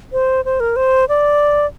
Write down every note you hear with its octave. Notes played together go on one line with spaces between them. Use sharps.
C5
C5
A#4
C5
D5